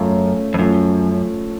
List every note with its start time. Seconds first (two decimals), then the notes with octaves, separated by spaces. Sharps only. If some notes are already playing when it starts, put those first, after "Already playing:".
Already playing: F#2 A3 C#4 F4
0.54 F2
0.59 F#2 F3 A3 C#4